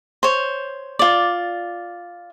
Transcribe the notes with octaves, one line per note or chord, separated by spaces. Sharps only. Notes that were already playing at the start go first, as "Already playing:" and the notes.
C5 C#5
F4 D5